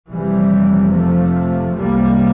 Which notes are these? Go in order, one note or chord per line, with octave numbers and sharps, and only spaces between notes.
F1 F2 C3 E3 G3
F3 A3
C2 C3 G3 A#3